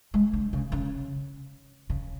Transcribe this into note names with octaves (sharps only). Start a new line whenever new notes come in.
G#3
D3
C#3
C#3
C#3